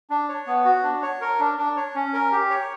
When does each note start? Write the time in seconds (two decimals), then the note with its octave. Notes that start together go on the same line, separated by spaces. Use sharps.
0.10 D4
0.29 C#5
0.47 B3
0.65 F#4
0.84 D4
1.03 C#5
1.21 A#4
1.39 D4
1.58 D4
1.77 C#5
1.95 C#4
2.13 A#4
2.32 G4
2.50 C#5